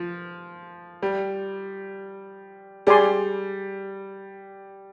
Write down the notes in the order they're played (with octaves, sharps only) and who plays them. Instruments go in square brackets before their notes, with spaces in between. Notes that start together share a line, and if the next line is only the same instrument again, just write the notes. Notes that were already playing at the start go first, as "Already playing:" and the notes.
Already playing: [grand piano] F3
G3
[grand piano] G3 [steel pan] G#4 D5 G#5 C6